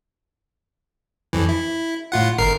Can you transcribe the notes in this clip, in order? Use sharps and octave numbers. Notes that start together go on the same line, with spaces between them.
F2 E3
E4
A2 F4 F#5
G1 A#4 C7